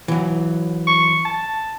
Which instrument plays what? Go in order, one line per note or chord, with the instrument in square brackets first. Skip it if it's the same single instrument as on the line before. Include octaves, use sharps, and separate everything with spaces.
[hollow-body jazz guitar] E3 F#3
[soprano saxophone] C#6
A5